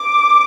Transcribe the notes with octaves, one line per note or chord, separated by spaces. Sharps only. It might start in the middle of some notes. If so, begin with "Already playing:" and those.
Already playing: D6